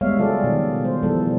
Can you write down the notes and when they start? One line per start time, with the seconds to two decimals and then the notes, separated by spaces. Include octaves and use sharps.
0.01 G3 G#3 B3 C#5 E5 F5
0.18 C#3 F#3 F4 G#4 A4 D5
0.44 B2 D#3
0.84 G3 C5
1.03 B2 E3 F3 G3 A4